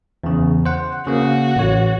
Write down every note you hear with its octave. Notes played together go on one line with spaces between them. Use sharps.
E2 C#3
C5 F#5
C#3 A#3 F#4
A1 C#5